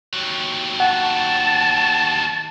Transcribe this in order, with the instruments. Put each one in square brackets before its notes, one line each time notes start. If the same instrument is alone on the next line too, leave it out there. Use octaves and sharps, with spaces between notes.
[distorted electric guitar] D#2 F#3
[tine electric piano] F#5 [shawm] A5